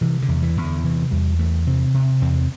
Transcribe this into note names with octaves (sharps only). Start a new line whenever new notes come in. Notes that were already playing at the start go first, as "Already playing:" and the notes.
C3 E3
D3
E2
E3
E2
D3
C3 E3
E2 G3
E2 A3
C3 C4
C3
E2 C4